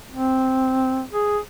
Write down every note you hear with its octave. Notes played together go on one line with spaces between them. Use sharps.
C4
G#4